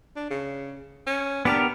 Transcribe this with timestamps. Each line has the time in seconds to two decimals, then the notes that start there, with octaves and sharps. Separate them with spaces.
0.16 D4
0.30 C#3
1.07 C#4
1.45 B3 D4 G4 A#4